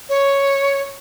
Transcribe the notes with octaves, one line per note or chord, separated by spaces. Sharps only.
C#5